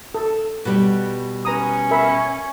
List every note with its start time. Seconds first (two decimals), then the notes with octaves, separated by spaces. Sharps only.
0.15 A4
0.65 B2 G3
1.45 C#4 B4 A#5 D#6
1.91 A#4 E5 B5